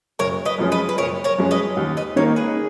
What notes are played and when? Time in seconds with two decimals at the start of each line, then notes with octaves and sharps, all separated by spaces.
0.19 F#1 A#4 C#5
0.45 B4 D#5
0.58 F#2 F3 G#3 C#4
0.72 B4 D#5
0.89 B4
0.98 F#1 A#4 C#5
1.24 A#4 C#5
1.38 F#2 F3 G#3 C#4
1.51 B4 D#5
1.77 D#2
1.97 B4 D#5
2.16 D#3 A#3 D#4 A#4 C#5 F5
2.36 G#4 B4